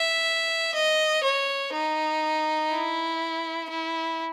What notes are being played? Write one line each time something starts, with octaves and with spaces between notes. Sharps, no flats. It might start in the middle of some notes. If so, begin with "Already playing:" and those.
Already playing: E5
D#5
C#5
D#4
E4
E4